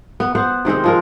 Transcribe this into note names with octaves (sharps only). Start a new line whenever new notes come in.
B3
B3 C5 F#5
C3 D#3 G#3 C4
F3 G#3 A#4